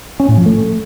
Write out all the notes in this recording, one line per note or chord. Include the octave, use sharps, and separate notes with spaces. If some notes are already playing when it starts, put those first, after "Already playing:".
C#4
A2
F3
A3